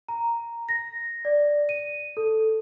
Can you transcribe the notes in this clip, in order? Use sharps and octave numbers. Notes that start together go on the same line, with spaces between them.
A#5
A#6
D5
D#7
A4